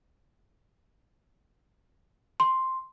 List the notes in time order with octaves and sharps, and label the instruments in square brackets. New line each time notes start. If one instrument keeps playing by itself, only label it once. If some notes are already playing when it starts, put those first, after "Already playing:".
[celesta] C6